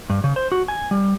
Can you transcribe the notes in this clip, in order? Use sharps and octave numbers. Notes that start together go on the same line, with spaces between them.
G2
C#3
C5
F#4
G#5
G3